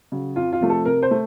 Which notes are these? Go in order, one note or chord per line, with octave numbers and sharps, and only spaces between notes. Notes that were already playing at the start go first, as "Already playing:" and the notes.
C#3 F#3
F2 F4
F4
C3 F3 A3
A4
C3 A#4
C5
A3